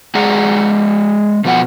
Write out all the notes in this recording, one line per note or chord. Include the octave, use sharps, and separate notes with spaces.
G#3 G#4 D5 F#5 A#5
B2 F3 B3 C5 F#5